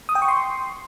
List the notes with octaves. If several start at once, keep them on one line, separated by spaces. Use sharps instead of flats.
D#6
G5
C#6
C6